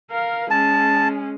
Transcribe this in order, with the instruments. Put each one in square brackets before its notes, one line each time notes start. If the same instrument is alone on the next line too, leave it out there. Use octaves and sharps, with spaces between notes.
[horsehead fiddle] A#4 F5
[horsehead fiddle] G#3 C#4 [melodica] A5